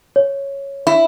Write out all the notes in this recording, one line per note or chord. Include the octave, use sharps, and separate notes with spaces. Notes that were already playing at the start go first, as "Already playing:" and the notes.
C#5
E4